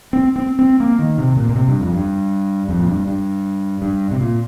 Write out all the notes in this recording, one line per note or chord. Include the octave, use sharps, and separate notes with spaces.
C4
C4
C4
A#3
D#3
C3
A#2
A#2
C3
G2
F2
G2
F2
A#2
G2
G2
G2
C3
A#2